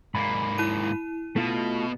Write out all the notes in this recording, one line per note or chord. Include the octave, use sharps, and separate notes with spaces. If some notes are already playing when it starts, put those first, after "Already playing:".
G#2 A#3 B5
E4 D#7
B2 A3 F4 A5